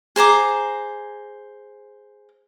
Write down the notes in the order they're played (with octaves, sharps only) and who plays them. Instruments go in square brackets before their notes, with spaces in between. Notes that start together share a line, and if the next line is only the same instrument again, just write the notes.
[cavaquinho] G#4 C5 A#5 D6